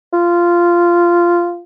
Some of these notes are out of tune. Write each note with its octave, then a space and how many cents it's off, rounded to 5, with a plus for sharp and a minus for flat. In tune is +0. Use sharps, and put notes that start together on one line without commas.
F4 -10